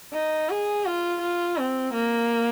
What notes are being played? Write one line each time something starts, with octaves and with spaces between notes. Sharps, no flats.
D#4
G#4
F4
F4
C4
A#3